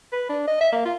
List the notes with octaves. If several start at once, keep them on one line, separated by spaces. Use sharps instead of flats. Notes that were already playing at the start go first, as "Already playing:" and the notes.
B4
D4
D#5
E5
A#3
F4